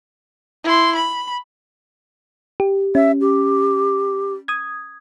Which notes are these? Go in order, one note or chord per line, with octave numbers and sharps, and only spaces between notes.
E4 C6
B5
G4
C#4 E5
G4
D#6 G#6